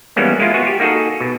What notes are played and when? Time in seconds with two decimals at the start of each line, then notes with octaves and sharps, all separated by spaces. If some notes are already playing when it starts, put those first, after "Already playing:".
0.16 E3 G3 G#3 A#3 B3 C#4
0.40 G#3 A#3 E4 F4
0.54 B3 F#4 G#5
0.67 G4
0.80 A#3 D#4 F#4 G#4 A4
1.21 B2